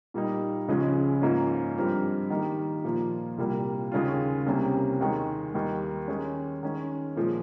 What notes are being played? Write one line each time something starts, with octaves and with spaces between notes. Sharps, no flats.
A#2 G3 A#3 D#4
C#2 C#3 F3 G#3 C#4
G#2 F3 A#3 C#4 F4
G2 F3 C4 G4 A#4
D#3 A#3 D#4 G4
A#2 F3 A#3 F4
C2 A#2 G3 A#3
D#2 C#3 G#3 C#4 F4
C2 C3 G3 A#3 C#4
D#2 D#3 G#3
D#2 D#3 G3 A#3 D#4
D#3 G#3 C#4
D#3 G#3 C#4
A#2 F3 G#3